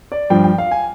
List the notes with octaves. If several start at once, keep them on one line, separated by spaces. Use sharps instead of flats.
D5
G2 F3 G5
G5
F5
G#5